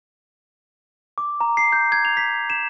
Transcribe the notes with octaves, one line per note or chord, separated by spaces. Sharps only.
D6
A#5
C7
G6
G#6
F7
B6
E7